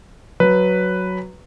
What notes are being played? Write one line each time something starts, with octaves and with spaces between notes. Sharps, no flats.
F#3 B4